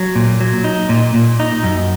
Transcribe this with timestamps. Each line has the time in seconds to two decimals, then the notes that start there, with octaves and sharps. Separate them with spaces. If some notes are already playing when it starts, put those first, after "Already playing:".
Already playing: F#3
0.16 A#2
0.40 F#3
0.64 D#4
0.89 A#2
1.14 A#2
1.40 D#4
1.64 F#2